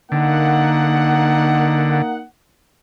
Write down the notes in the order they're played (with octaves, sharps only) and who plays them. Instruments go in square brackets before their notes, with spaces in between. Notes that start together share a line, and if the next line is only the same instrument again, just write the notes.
[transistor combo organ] D3 [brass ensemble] A#3 D#4 F#5